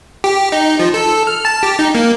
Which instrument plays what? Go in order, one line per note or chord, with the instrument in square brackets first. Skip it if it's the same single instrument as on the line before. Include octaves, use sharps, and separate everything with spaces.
[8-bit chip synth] G4
D#4
F3
A4
F6
A5
G4
D#4
A#3